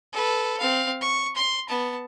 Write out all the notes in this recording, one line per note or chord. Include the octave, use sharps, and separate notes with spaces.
A4 B4
C4 F5
C#6
C6
B3 A5